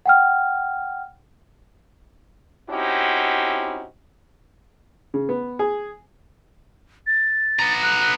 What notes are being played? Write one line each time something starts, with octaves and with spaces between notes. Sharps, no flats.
F#5 G5 F6
C4 C#4 D#4 E4 F#4 G4
C#3
B3
G#4
A6
B3 A#5
F#6